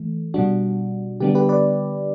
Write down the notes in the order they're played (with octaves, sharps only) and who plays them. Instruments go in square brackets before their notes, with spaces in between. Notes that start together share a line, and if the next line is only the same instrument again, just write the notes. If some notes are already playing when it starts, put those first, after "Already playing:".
Already playing: [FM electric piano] E3 A3
B2 G3 D4 F#4
D3 G3 B3 D4 G4
G4 B4
B4 D5